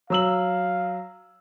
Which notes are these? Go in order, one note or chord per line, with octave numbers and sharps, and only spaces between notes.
F#3 F5 E6 F#7